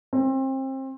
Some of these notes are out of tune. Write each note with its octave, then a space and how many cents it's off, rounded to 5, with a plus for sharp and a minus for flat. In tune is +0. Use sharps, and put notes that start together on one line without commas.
C4 +30